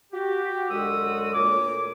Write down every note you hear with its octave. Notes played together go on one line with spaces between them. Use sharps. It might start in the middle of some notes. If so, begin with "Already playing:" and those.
F#4 G4
F#2 D3 G#3 F#4 D#6 E6
D2 A#2 C#5 D6